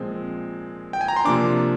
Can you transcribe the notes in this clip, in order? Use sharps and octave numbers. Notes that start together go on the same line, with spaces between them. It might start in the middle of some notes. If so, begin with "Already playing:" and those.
Already playing: A#2 F3 G#3 C4
G5
G#5
A#5
C6
C3 F3 A#3 D4 D6